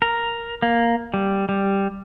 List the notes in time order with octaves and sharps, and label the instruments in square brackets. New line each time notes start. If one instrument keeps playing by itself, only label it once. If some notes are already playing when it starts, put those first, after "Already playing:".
[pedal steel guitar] A#4
A#3
G3
G3